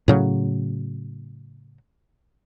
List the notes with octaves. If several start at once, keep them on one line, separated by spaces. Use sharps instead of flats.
A2 C#3 F#3